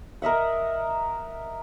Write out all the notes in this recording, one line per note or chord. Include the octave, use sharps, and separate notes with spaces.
A#4 D#5 E5 F#5